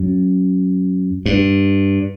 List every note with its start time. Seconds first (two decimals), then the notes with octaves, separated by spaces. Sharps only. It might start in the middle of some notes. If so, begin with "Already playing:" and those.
Already playing: F#2
1.26 G2